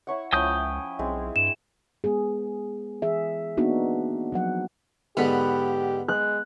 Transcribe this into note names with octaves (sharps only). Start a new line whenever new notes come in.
E4 C#5 F#5
C#2 F3 C#4 E4 G5 D#6 G6
B1 G#3 C4 E4
G2 E7
G#3 B3 G#4
E3 G#4 E5
A#3 B3 D4 D#4 F#4
F3 F#3 F#5
G#2 D3 B3 G4 B4
G#3 F#6